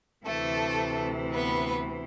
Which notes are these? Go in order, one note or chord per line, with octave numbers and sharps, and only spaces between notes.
D2 C3 E3 A3 A4
B3 B4